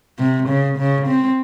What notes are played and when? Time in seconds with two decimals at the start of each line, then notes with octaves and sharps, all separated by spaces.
0.19 C3
0.48 C#3
0.77 C#3
1.07 C4